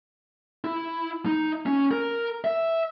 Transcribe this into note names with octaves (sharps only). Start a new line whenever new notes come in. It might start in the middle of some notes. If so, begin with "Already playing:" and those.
E4
D#4
C#4
A#4
E5